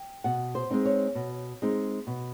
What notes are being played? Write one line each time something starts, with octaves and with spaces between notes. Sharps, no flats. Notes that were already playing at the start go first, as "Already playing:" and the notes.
Already playing: G5
B2 F#5
C5
G#3 C4 D#4
C#5
B2
G#3 C4 D#4
B2